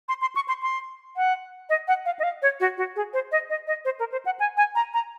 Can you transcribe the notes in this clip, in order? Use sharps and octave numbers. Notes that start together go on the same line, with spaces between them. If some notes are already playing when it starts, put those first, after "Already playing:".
C6
C6
C#6
C6
C6
F#5
D#5
F#5
F5
D#5
F5
C#5
F#4
F#4
G#4
C5
D#5
D#5
D#5
C5
A#4
C5
F#5
G#5
G#5
A#5
A#5